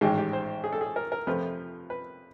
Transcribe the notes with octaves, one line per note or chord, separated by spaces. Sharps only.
A1 G#2 D#3 G#3 G4
G4
C5
G#4
A4
G#4
A#4
A#4
F2 C3 F3 A3 B4
B4